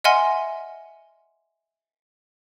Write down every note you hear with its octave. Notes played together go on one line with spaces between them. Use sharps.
D#5 E5 F#5 G#5 C6 F6